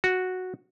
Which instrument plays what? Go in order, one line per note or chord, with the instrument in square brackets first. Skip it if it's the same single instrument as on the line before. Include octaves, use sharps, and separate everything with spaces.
[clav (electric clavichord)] F#4